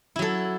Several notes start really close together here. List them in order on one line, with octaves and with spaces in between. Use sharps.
E4 F#3 A4